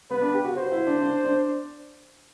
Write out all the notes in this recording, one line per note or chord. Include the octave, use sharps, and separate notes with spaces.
B3 B4
D4
G4
F#4
F#4 C5
E4
D4
D4
D4